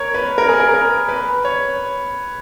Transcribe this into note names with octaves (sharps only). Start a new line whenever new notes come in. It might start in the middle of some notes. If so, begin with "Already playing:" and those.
Already playing: A#4 C#5
B4
A#4
G#4
A#4
A#4
B4
C#5